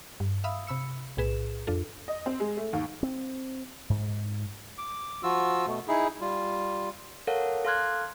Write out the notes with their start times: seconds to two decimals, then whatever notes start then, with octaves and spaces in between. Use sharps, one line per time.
0.20 G2
0.44 E5 F5 B5 D#6 E6
0.67 C3 B5 E6 C#7
1.17 B1 A2 G#4 B4 E7
1.67 F2 D4 F4 A4
2.08 D#5
2.26 C4
2.40 G#3
2.57 A3
2.73 D#2
3.03 C4
3.90 G#2
4.78 D6
5.23 F3 F4 F#4 E6
5.67 B2 A3
5.88 D#4 E4 G#4
6.21 G3 F4
7.27 A4 A#4 C#5 F5 F#5
7.65 A4 F5 C6 F6 F#6 G#6